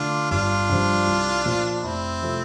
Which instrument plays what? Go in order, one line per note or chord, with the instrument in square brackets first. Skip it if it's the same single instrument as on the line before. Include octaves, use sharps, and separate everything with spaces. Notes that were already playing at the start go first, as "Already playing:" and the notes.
Already playing: [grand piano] D3 A3 [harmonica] D4 F4
[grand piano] G1 [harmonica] D4 F4
[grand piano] G2 F3
C2
A#2 F3
[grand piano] F1 [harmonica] C4 E4
[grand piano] C3 F3 A3